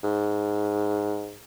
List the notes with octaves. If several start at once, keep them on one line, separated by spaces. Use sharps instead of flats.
G#2